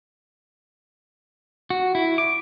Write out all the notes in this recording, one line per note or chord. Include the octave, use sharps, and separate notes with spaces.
F#4
E4
D6